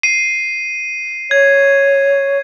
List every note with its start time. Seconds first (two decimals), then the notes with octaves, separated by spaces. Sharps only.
0.03 C7 D#7
1.31 C#5 G#6